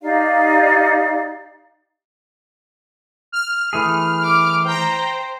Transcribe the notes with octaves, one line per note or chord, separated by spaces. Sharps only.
D#4 G4 D5 F5
F6
E3 A3 G#4
D6
C5 G5 A#5